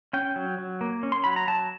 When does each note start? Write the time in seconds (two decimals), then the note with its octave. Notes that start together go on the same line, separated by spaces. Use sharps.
0.13 C#4 G5
0.36 F#3
0.58 F#3
0.81 A#3
1.03 C#4
1.12 C6
1.24 F#3 B5
1.36 A#5
1.48 F#3 A5